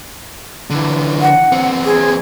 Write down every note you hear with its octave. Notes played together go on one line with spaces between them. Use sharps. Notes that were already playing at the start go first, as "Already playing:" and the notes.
D3 E3
F#5
E2 C4
G#4